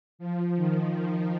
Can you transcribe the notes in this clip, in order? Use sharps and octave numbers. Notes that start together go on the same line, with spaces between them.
F3
D#3
F3